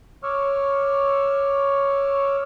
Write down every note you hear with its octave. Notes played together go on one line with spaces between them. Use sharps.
C#5 C#6 D6 E6 F6